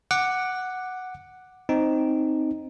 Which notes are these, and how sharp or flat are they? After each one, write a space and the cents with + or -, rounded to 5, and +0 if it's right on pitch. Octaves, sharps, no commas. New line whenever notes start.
F#5 +0 D6 +10
C4 +0 D#4 +0